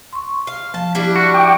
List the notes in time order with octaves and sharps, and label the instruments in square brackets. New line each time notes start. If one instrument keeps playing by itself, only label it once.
[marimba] C6 C#6
[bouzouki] F5
[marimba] F3 [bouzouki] A5
[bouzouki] G3 D4 E4
[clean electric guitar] F#4
[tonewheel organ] G5 D6